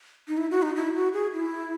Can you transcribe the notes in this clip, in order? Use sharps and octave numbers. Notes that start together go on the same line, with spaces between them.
D#4
E4
F#4
D#4
E4
F#4
G#4
E4